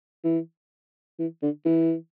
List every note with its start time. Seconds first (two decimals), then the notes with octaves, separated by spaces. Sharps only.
0.24 E3
1.19 E3
1.43 D3
1.65 E3